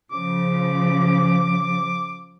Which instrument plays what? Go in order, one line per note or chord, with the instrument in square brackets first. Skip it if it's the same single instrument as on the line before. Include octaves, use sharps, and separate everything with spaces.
[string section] C#3 F3 [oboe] D6